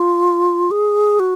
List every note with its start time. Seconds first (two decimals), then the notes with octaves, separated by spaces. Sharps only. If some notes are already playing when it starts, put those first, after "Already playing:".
Already playing: F4
0.71 G#4
1.19 F#4